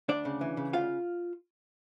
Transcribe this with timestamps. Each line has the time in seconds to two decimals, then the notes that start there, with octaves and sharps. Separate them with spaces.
0.08 D2 D4 D5
0.25 C#3
0.41 E3
0.57 C#3
0.73 D2 F4 F5